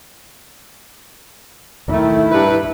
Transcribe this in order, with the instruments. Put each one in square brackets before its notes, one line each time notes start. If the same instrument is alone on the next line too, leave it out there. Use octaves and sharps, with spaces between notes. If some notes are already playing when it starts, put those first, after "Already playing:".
[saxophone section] D#3 A3 [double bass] E4
[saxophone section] G2 B4